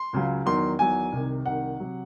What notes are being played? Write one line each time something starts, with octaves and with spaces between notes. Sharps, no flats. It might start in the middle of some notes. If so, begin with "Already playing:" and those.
Already playing: C6
C#2 C#3 F#3
E2 D#3 F#3 C6
E2 D#3 F#3 G#5
C2 C3 D#3
C2 C3 D#3 F#5
C3 F#3